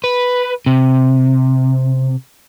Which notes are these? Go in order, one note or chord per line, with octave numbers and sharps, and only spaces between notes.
B4
C3